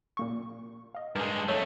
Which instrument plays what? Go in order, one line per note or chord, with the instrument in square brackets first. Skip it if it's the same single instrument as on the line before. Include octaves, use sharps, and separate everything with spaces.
[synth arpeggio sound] A#2 A#3 C#6
D#5 F5
[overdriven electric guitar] G2 G#3 [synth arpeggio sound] A#4 G#5
[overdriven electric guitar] F2 A3 [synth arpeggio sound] A4 C#5 E6